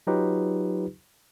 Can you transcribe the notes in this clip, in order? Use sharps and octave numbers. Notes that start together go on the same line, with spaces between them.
F#3 D#4 F4 G4 B4